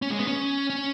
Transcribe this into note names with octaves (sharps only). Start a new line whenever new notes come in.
C#4
G#3
B3
C#4
C#4